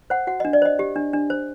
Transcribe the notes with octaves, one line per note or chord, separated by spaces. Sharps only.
C5 F#5
F#4 F#5
D4 D#5
D5
C5 D#5
G4
D4
D4
C5